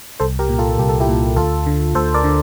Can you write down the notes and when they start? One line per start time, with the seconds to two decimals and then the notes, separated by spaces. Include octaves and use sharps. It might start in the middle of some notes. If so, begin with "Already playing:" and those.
0.20 C2 A4 C5
0.39 G4 A#4
0.49 A#2
0.59 F4 A4
0.78 C2 G4
0.89 A4
1.00 E4 G4
1.08 A#2
1.36 D2 F4 A4
1.67 D3
1.95 D2 A4 C5
2.14 A#4 D5
2.24 D3